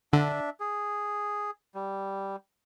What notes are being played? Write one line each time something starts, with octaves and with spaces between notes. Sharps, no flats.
D3 D4 E5
G#4
G3